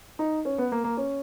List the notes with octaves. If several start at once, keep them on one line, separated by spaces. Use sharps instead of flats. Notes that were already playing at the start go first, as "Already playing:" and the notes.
D#4
C#4
B3
A#3
A#3
C#4